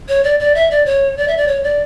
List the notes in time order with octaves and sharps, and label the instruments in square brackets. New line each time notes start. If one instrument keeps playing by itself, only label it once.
[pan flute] C#5
D5
D5
E5
D5
C#5
D5
E5
D5
C#5
D5